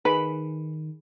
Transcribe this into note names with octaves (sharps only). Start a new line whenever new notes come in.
D#3 G#4 B4 B5